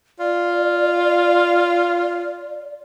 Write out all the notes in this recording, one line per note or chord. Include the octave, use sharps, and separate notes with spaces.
F4 D5